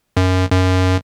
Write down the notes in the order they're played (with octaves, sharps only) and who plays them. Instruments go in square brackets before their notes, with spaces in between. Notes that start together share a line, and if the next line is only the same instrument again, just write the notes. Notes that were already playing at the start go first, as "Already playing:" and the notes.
[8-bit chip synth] F#2
F#2